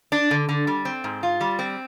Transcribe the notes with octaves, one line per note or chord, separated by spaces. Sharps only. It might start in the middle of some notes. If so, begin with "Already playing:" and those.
D4
D3
D3
G3
C4
G#2
F4
G3
C4